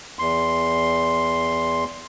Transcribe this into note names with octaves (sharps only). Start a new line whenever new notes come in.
E2 C6